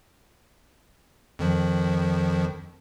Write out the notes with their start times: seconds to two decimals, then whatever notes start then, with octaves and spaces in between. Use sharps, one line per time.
1.39 F2 D#3 F3